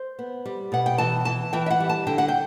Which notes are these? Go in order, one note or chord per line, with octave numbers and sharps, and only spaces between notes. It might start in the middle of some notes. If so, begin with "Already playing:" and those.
Already playing: C5
B3
G3
B2 F#5
G5
E3 A5
E3 A5
E3 G5
E5
F#5
G3
A5
D3 G5
F#5
G5